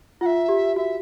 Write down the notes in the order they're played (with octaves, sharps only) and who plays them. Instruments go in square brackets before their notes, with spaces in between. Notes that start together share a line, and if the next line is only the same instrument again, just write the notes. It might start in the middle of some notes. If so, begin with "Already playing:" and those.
[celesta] F4 [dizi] F#5
[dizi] E5
[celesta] G4
[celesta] F#4 [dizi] E5